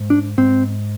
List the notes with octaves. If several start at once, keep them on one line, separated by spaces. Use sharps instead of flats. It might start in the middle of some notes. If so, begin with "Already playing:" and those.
Already playing: G#2
D4
G#2 C4